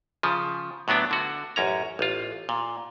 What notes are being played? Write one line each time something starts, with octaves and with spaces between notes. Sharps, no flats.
C#3 F3
A2 F#3 B3 D4
D3 F#4
A1 F#2 C#4 A#5
A1 F4
A#2